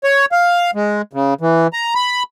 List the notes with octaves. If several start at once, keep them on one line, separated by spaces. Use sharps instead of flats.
C#5
F5
G#3
C#3
E3
A#5
B5